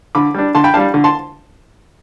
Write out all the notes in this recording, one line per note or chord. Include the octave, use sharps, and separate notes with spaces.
D3 B5 D6
G3 D4
D3 A5 C6
G5 B5
G3 D4 F5 A5
D3
A5 C6